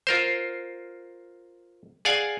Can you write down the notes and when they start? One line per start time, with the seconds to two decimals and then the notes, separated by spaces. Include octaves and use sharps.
0.07 F4 A#4 C5
2.05 G#4 D5 F5 F#5 G#5